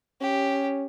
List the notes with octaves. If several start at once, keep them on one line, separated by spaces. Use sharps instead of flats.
C#4 G4